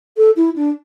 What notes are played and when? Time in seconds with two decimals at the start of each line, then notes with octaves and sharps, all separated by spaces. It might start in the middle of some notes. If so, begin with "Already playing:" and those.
0.17 A4
0.36 E4
0.56 D4